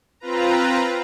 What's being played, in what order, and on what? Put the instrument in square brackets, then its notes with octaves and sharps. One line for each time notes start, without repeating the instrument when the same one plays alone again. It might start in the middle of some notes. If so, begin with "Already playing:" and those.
[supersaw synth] C4 F4 B4 A#5